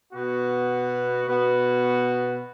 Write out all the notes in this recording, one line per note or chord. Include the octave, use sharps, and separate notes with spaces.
B2 B3 F#4
B2 B3 F#4